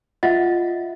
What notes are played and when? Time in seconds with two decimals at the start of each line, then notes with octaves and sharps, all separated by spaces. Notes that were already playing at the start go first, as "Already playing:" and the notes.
0.23 F4 D#5 E5 F#5 A6